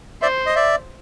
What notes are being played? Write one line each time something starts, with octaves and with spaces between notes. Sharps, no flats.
C5 D5 E5
D#5
D5 E5